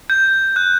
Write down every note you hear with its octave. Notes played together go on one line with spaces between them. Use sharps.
G6
F#6